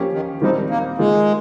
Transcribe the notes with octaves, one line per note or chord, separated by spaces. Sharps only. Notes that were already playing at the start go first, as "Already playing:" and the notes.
Already playing: F3 A#3 C#4 G4
D#3
D#3 F3 G3 C4 D#4 G4
A#3
D#3 G#3 A#3 F4 G#4